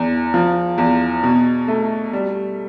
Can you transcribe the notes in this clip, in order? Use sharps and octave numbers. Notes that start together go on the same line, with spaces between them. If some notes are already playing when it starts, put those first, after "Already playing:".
Already playing: E2
F3
E2
B2
A3
G3